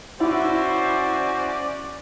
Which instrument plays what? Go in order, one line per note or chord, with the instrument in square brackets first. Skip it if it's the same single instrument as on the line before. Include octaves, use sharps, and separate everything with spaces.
[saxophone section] C#4 D5 [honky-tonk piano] E4 [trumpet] F#4 [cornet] C5